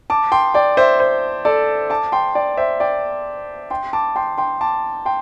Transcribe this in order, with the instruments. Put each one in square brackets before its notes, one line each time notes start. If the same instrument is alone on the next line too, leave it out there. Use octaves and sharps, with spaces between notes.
[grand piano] A5 D6
G5 C6
D5 G5
C5 E5
C5
A4 D5
A5 D6
G5 C6
D5 G5
C5 E5
D5 G5
G5 C6
A5 D6
G5 C6
G5 C6
A5 D6
G5 C6